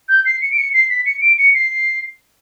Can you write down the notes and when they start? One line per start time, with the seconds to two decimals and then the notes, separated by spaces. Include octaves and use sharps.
0.09 G6
0.25 C7
0.41 C#7
0.52 D7
0.57 C#7
0.73 C7
0.90 B6
1.05 C#7
1.21 D7
1.38 C#7
1.54 C7